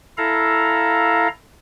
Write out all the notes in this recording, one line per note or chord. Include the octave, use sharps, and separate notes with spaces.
E4 A4 F5 A#5